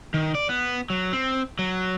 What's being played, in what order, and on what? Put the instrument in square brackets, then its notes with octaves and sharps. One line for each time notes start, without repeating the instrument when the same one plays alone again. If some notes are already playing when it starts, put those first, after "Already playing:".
[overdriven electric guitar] D#3
D5
B3
F#3
C4
F#3